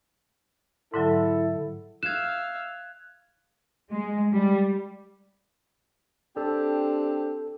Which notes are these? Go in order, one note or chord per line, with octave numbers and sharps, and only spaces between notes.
G#2 D3 F#3 E4 A4
E5 F5 F#6 G#6 E7
G#3
G3
C4 D4 G4 A4